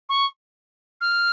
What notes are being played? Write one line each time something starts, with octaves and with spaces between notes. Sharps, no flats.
C#6
F6